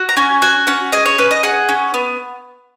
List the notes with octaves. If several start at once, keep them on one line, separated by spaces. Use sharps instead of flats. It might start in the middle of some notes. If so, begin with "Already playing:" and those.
Already playing: F#4
A#5
C#4 G#5
F#4 G#5
C#4 F#5
G#4 D#5
C#5
C#4 B4
D#5
G#4 F#5
C#4
B3